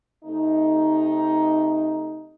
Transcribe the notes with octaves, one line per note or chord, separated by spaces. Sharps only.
C3 A3 D#4